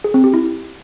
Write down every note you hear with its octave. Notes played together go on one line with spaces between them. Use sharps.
G#4
C4
G4
E4